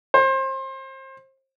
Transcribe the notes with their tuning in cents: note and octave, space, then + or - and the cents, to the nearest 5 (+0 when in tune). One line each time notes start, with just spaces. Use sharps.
C5 +30